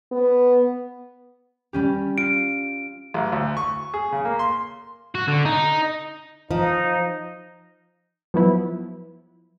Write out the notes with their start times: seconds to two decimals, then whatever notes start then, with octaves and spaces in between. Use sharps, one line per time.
0.12 B3
1.73 G3 C#4 G4
2.18 F4 D7
3.14 A1
3.32 D2
3.57 C#6
3.94 G#4
4.12 C#3
4.25 A#3
4.39 C6
5.15 F#4
5.28 D3
5.45 D#4
6.51 F3 D#4
8.34 F3 F#3 B3 E4